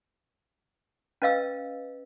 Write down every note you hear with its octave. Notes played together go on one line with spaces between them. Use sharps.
C#4 B4 D#5 F5 E6